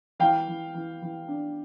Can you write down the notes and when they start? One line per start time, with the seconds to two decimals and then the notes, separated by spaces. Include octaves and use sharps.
0.19 E3 F5 G5
0.48 E3
0.74 E3
1.02 E3
1.28 D4